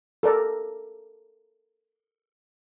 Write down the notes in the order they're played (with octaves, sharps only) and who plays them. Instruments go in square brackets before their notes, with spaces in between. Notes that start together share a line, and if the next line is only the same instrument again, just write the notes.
[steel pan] A4 A#4 D5